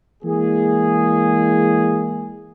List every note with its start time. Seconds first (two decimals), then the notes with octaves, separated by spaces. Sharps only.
0.23 E3 G#3 A#3 G#4